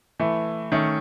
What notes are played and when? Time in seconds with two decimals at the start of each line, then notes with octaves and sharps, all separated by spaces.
0.19 E3 A3 E4
0.72 D#3 A3 C#4